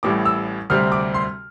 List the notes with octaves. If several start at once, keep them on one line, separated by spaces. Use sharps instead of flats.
A1 A2 G3 D6
E6
D2 C3 G3 C4 F6
D6
C6